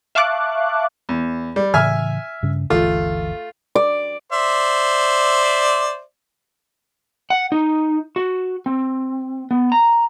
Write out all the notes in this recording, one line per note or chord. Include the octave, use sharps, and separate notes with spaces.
E5 F5 A5 C#6 D6 F#6
E2
G3
A2 C#3 E3 E5 G#5 F6
G2 C#3 C#4
G1 D2 E3 A3 F4
D5
C5 D5 E5
F#5
D#4
F#4
C4
B3
A#5